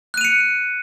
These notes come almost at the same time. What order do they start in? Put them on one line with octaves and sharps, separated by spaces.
F#6 D#7 F7 C#7